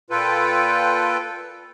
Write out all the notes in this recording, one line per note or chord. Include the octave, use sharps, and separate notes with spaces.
A#2 F4 A4 B4 G5